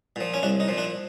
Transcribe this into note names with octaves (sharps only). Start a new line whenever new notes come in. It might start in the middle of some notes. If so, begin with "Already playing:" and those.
A#2 F3
C#4
C2 D4
D#4
A#2 F3
D4